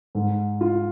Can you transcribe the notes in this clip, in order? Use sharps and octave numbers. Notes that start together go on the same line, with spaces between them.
G#2
F4